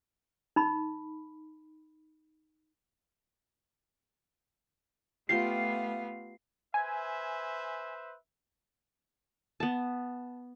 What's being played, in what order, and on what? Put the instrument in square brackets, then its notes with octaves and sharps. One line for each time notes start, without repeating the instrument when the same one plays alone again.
[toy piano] D#4 B5
[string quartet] A3 B3 F5 [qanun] F4 G4 [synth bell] C7
[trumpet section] B4 C5 E5 [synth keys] G#5
[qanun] B3 A5